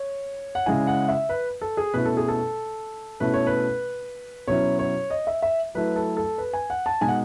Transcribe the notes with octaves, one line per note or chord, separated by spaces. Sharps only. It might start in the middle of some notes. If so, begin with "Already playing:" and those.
Already playing: C#5
F#5
C#3 G#3 C#4 E4 G#5
F#5
E5
B4
A4
G#4
B2 A3 C#4 E4 B4
A4
G#4
A4
B2 A3 C#4 E4 B4
C#5
B4
B2 F#3 C#4 E4 C#5
C#5
D#5
E5
E5
F#3 A3 E4 B4
A4
A4
B4
G#5
F#5
A5
B2 G#3 D#4 G#5
F#5